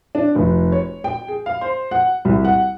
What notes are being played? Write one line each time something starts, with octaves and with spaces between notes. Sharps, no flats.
D4
F1
C#5
G5
G#4
F5
C5
F#5
C2
F#5